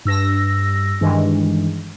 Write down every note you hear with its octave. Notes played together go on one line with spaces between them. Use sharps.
G2 E6 A#6
G2 D#3 E3 G#3